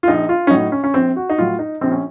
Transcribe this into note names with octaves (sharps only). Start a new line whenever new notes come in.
F4
A#1 D#4
F4
C#4
A2 F#3 D#4
C#4
C#4
A#1 C4
F#4
D#4
A2 F#3 F4
D#4
A#1 C4
C#4